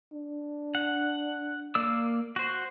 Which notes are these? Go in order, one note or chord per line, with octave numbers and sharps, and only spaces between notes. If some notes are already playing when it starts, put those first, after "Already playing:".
D4
F#5
A#3 D5 E6
F#4 C5